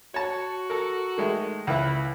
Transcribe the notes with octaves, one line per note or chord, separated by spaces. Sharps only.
F#4 C#5 A5
A4 A#4
D#3 G#3 A3
C#2 E4 B4